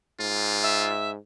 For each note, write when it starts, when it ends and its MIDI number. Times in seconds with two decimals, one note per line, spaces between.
0.20 1.17 44
0.20 0.91 65
0.62 1.10 76